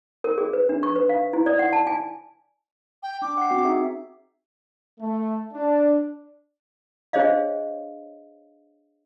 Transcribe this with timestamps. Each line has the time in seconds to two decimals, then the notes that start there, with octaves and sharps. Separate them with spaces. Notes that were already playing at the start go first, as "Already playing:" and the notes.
0.24 A#4
0.38 G#4
0.53 B4
0.69 D4
0.83 C#6
0.96 B4
1.09 F5
1.33 E4
1.46 D5
1.59 F#5
1.73 A5
1.87 G#5
3.03 G5
3.22 D4 D6
3.37 F#5 G5 C7
3.51 C4 F#4
3.65 D#4 G#4 E5
5.00 A3
5.53 D4
7.13 D4 G#4 C5 C#5 D#5 F5